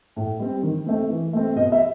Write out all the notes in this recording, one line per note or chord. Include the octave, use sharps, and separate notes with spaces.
A2
G3 C4
D#3
A3 C4
E3
A3 C4
B2 D#5
E5